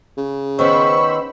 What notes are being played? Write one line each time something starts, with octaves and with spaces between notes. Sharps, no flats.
C#3
D#3 B3 C#4 C5 B5 C#6 E6